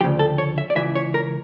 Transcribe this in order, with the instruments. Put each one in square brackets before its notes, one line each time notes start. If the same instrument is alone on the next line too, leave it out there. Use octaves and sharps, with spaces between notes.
[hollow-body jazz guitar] D2 C#3 F3 G4
A4
C#5
E5
D5
C#2 C#3 E3 E5
C#5
A#4